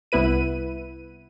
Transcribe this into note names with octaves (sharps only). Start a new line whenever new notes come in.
C2 B3 E4 B4 D#7